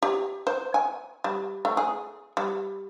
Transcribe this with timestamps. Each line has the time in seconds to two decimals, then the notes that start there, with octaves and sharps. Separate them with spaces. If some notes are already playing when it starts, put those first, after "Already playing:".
0.03 G4
0.47 C5
0.74 G#5
1.24 G3
1.65 A3
1.77 G#4
2.37 G3